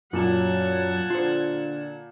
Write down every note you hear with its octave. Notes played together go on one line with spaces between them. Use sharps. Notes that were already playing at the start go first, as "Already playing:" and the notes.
F#2 A#2 F#3 F#5 A5 G#6
D3 F4 C5